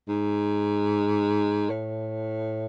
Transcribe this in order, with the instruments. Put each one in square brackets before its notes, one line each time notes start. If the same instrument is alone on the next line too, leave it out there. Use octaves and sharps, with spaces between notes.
[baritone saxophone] G#2
A2